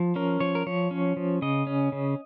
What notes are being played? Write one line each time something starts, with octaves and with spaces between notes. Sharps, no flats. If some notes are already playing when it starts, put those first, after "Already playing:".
Already playing: F3
C#4 A#4
F3 C#5
A#4
F3 C#5
C#4
F3
C#3 D#5
C#4
C#3